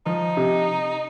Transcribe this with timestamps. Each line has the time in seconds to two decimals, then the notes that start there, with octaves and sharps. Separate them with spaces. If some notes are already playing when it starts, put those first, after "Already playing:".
0.06 F3 D#4
0.37 C3